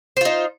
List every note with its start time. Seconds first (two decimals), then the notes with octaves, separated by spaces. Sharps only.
0.17 C5
0.21 F4
0.25 D#4